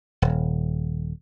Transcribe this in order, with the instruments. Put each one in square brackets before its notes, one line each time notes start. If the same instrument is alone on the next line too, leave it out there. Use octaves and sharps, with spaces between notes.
[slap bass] D#1